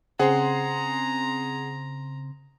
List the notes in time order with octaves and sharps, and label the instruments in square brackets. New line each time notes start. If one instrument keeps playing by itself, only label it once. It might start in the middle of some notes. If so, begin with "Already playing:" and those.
[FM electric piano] C#3 C4 C6 [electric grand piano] G#4 F#5 [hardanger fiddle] A#5